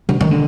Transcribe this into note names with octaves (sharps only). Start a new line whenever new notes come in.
D3
D#3
D3